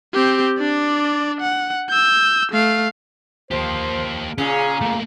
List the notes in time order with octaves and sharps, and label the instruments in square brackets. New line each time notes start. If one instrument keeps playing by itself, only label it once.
[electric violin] C4 G4
D4 D5
F#5
E6 G6
A3 F5
[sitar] F3 [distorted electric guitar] A#3 G4 [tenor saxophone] C5
[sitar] A#2 C#3 [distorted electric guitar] C#4 [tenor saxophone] G#4
[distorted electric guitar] A3 A#3